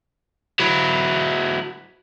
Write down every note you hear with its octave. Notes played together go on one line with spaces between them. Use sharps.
F#3 E4